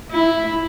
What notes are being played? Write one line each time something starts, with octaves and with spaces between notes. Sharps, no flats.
E4